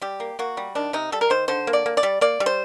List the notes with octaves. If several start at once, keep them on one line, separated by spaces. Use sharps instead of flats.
G3 G4
A#3
A#3 F#4
G3
D#3 D4
C3 D#4
G3 A4
A#4
D#3 C5
D3 C5
A#3
D5
A#3
D5
G3
A#3 D5
G3
C5